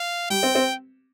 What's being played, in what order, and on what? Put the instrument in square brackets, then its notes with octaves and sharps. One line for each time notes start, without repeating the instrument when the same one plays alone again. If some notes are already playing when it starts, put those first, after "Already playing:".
Already playing: [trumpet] F5
[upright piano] G3 [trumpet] G5
[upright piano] C4
C4